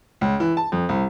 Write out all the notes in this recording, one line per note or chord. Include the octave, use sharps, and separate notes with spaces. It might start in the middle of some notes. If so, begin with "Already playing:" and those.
C#2
E3
A5
F2
C2